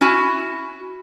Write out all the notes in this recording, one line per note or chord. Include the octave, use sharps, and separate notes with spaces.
C#4 E4 F#4 G#5